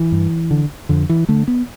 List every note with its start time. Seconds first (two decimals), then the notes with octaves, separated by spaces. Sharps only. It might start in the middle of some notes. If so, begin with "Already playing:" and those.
Already playing: E3
0.12 G2
0.51 D3
0.89 F2 D3
1.09 E3
1.29 D3 A3
1.48 B3